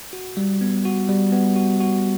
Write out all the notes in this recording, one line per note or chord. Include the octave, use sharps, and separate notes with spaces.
F#4
G3
B3
F#4
G3
B3
F#4
F#4